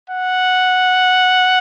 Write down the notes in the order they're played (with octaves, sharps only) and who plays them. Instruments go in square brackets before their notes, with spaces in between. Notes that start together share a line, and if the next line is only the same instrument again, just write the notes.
[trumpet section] F#5